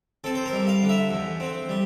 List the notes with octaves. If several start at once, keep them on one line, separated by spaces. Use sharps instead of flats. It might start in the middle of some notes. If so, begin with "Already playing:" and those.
C4 A4
C5
A#4
G3
F5
D3
E5
E2
C4
G3